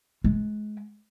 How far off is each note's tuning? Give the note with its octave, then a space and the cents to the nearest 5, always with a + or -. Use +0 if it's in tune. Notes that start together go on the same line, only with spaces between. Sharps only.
G#3 +30